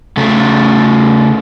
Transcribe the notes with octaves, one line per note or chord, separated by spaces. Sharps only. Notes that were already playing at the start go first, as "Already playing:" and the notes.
C#3 A3